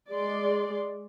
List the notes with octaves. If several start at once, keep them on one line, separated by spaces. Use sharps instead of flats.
G#3 D5 C6